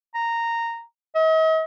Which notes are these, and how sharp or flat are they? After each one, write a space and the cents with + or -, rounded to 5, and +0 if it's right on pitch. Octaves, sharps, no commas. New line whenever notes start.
A#5 -10
D#5 +45